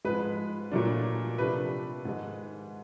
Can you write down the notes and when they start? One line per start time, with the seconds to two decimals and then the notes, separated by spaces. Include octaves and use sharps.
0.05 G#2 F3 G#3 B4
0.72 A#2 F#3 A3 D4
1.38 C3 F3 A3 D4 B4
2.05 G#2 D#3 G#3